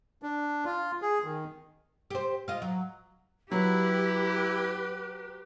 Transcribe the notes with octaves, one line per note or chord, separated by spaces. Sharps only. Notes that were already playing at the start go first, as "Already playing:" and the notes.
D4
F4
G#4
D#3
G4 C5
F4 D#5
F#3
F#3 E4 G4 B4